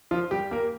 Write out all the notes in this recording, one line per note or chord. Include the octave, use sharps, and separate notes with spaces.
F3 F4
G3 G4
A#3 A#4